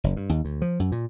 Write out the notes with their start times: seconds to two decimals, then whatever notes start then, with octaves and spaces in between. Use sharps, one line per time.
0.04 F#1
0.16 G2
0.29 D#2
0.45 D2
0.62 F3
0.80 F#2
0.92 A#2